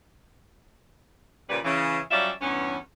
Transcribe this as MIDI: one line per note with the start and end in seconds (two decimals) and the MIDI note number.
1.50 1.59 46
1.50 1.59 49
1.50 1.59 53
1.50 1.59 55
1.50 1.59 71
1.64 1.98 49
1.64 1.98 52
2.11 2.30 54
2.11 2.30 55
2.11 2.30 61
2.11 2.30 65
2.11 2.30 74
2.11 2.30 76
2.41 2.76 40
2.41 2.76 43
2.41 2.76 59
2.41 2.76 61